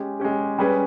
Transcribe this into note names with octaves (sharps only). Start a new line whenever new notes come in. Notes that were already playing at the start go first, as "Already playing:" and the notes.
Already playing: G#3 C#4 G4
G#3 C#4 G4
G3 C#4 G#4 B4